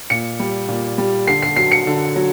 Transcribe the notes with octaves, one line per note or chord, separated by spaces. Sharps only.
A#2 C#7
G3
A#2
G3
D3 C7
C7
F#3 C7
C#7
D3
F#3